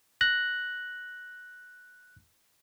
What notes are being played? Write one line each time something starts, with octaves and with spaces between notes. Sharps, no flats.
F#6 A#6